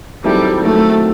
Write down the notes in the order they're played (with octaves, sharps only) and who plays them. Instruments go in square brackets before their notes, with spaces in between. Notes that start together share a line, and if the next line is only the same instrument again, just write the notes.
[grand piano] D#3 F#3 C4 E4 A4 [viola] G3
[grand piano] D#3 F#3 C4 E4 A4 [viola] A3